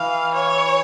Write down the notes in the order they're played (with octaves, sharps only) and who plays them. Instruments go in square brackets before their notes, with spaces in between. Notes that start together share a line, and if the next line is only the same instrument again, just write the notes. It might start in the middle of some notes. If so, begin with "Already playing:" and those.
Already playing: [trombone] E3 [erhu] F5
[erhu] C#5